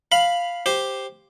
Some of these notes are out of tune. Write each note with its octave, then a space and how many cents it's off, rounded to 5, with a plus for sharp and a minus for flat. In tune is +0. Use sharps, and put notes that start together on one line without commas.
F5 +0 B5 +0
G4 +0 C5 +0